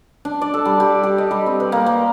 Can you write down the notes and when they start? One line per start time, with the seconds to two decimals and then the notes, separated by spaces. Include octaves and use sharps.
0.25 D4
0.42 D5
0.54 A4
0.65 G3
0.80 G4
1.04 G4
1.18 D#5
1.31 G3
1.46 C4
1.60 B4
1.72 A#3
1.86 A#3